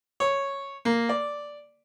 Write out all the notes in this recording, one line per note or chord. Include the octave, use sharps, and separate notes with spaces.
C#5
A#3
D5